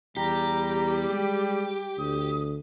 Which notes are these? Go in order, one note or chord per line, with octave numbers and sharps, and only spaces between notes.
E2 G3 G4 A#5
G#3 G5
D2 D#6